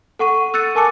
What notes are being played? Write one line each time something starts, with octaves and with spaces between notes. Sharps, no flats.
A4 F#5 C#6 D#7
E6 F#6 A6 C#7 D#7
A#4 G#5 A5 D6 C#7